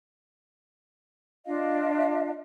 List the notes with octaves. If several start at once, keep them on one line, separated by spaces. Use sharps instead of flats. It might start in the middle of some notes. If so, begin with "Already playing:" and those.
D4 F4 D#5 F5